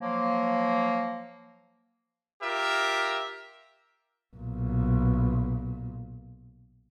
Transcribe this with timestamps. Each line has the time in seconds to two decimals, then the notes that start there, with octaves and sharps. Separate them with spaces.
0.01 F3 F#3 A#3
2.42 F4 G4 A#4 E5
4.36 B1 A#2